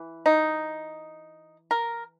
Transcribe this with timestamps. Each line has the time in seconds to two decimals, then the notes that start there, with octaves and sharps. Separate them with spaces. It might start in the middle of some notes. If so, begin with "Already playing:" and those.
Already playing: E3
0.26 D#4
1.71 A#4